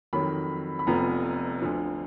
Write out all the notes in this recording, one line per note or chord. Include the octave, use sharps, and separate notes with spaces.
F2 D#3 F#3 B5
B5
F1 F2 F3 B3 A#5
D2 D3 F3